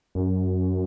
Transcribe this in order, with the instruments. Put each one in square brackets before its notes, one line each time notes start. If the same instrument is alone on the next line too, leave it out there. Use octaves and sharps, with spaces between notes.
[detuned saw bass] F#2